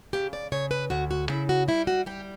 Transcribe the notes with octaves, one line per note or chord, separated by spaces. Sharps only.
C#3 G4
D5
C#3 C#5
B4
D2 F#4
F#4
C#3 E4
F#4
G3 E4
F#4
G3 G4